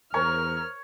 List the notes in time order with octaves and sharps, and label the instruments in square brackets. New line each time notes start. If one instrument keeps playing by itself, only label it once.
[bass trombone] E2 [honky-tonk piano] A#4 C5 [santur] C#5 [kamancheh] F6